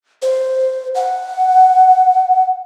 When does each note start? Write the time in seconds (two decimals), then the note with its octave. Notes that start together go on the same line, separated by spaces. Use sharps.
0.22 C5
0.95 F#5